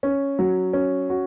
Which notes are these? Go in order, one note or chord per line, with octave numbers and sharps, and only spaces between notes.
C#4
F#3
C#4
F#4